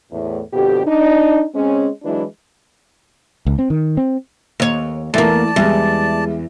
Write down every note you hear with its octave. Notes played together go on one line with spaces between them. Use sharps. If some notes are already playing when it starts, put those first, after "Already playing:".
E2 A2
F2 B2 D3 G4
D4 D#4
G#3 C4 C#4
E3 F#3 G#3 D4 E4
C#2
C4
D#3
C4
D#2 C#5
E2 E3 A3 A#3 D5 A5
E2 G3 G#3